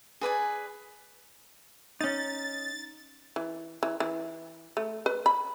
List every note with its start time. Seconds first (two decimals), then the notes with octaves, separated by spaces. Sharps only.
0.21 G#4 B4 D5 G#5
2.01 C#4 D#4 A6
3.36 E3
3.83 E3
4.00 E3
4.77 A3
5.06 B4
5.26 B5